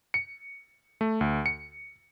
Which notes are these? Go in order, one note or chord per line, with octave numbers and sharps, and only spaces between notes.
C#7
A3
D2
C#7